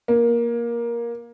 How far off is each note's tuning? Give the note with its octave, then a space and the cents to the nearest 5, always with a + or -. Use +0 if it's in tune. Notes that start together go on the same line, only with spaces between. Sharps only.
A#3 +15